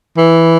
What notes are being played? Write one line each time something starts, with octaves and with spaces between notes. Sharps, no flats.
E3